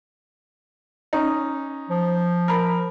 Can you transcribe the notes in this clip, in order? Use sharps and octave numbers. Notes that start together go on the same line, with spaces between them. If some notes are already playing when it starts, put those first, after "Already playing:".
C#4 D#4
F3
A#4 B5